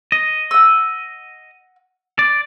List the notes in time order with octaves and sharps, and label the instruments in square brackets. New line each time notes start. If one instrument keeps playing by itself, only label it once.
[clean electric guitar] D#5
[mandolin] F#5 E6
[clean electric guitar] D5